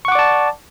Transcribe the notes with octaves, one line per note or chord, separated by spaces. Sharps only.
D5 F#5 A5 C#6 D6